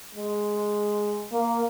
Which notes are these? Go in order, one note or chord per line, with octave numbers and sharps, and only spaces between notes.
G#3
A#3